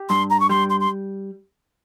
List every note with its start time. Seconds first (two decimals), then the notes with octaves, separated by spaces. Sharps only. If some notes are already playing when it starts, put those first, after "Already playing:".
Already playing: G4
0.09 G2 C6
0.30 A#5
0.40 C#6
0.49 G3 C6
0.70 C6
0.80 C6